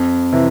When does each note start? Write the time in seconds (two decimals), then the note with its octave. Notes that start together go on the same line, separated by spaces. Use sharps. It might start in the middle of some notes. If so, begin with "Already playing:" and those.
Already playing: F2
0.32 C3 E3